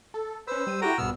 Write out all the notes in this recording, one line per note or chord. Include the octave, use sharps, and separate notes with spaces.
A4
C#4 B4 C5 E6
G3 D#7
E4 F#4 G4 A4 G5 A#5
A#1 G2 B2 B3 E6 F6